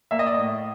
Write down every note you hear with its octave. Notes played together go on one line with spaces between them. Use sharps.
A#3 E5
D#5
D5
A2 D#5